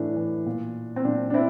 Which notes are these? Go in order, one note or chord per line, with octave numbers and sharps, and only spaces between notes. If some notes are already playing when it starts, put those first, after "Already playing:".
Already playing: A2 E3 D4
E3
A#2
C4
A#2 D4
D4
C4 E4